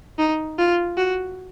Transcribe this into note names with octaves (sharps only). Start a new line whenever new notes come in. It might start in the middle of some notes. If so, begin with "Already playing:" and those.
D#4
F4
F#4